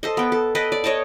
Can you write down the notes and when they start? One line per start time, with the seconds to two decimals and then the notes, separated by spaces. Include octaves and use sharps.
0.03 A4 C5 D#5
0.17 B3 G5
0.32 A4
0.55 A4 B4 D#5 G5
0.72 D5
0.84 C#5 D#5 G5 A5